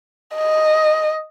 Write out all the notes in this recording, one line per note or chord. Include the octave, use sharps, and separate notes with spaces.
D#5